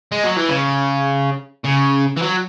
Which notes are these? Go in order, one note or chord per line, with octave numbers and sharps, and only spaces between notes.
G#3
F#3
E3
C#3
C#3
E3
F#3